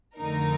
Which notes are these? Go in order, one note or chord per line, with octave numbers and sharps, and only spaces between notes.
F2 D3 A3 D#4 A#4